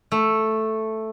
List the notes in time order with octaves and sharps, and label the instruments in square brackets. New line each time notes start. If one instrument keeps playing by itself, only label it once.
[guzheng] A3